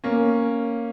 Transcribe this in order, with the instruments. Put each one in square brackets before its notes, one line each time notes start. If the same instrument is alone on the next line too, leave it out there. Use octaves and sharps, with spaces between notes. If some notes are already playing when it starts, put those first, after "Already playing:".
[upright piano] A#3 C#4